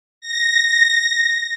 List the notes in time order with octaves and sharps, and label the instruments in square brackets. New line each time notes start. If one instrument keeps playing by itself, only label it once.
[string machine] A#6